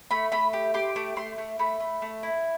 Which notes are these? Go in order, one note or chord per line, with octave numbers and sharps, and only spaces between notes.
A3 B5
A3 B5
G4
G4 C6
A3 D6
A3 C6
A3
A3 B5
A3
A3
E4